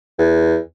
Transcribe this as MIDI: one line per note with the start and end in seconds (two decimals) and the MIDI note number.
0.18 0.57 40